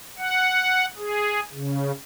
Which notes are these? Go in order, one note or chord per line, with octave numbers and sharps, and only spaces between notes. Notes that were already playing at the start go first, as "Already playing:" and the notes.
F#5
G#4
C#3